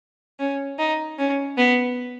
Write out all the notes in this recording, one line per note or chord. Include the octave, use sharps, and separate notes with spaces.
C#4
D#4
C#4
B3